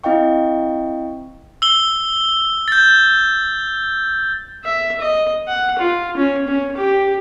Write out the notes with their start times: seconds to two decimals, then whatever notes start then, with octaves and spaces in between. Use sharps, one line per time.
0.04 C4 E4 D#5 F5 G5 C#6
1.62 E6 G7
2.68 G6 A6
4.65 E5
5.01 D#5
5.48 F#5
5.79 F4
6.17 C#4
6.48 C#4
6.77 G4